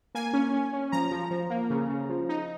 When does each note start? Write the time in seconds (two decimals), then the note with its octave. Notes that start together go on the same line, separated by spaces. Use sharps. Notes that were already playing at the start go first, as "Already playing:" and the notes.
0.15 A#3 G#5
0.33 C#4
0.53 C#4
0.73 C#4
0.92 F3 A#5
1.11 F3
1.31 F3
1.50 A#3
1.70 C#3
1.89 C#3
2.09 F3
2.29 D#4